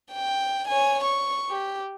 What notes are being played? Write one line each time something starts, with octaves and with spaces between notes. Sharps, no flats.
G5
C#5 G#5
C#6
G4